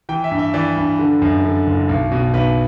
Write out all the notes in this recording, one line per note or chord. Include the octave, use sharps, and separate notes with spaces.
E3 G5
E5
G2
E5
E3 D5
G2
D3
F#2
D3
F#1
B1
B2
B1 B4